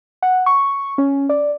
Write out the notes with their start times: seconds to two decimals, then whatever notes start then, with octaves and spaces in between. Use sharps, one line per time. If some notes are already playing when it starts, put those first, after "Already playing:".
0.23 F#5
0.46 C#6
0.98 C#4
1.29 D5